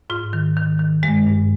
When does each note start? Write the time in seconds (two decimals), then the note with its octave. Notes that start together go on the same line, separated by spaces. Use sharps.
0.10 G#2 F4
0.33 D#3
0.57 D#3
0.79 D#3
1.03 G2 G#3
1.26 G2